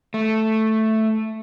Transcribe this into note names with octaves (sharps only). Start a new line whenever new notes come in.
A3